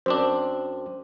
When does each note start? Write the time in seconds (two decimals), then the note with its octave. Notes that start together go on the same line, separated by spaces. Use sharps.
0.06 F#2 C4 D4 C5